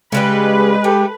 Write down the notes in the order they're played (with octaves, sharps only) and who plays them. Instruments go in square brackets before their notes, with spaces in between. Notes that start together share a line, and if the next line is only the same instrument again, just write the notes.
[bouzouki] C#3 G3 G4 [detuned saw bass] G#3 [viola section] B4
[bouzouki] A3 [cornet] G4